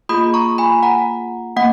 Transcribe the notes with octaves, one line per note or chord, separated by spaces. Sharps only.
A#3 F4 G#4 B5 D#6
A#5 C#6
G#5 B5
F#5 A#5
A#3 F#5